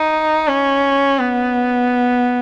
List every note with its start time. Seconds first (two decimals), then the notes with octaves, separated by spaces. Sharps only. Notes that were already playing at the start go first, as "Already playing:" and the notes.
Already playing: D#4
0.48 C#4
1.19 B3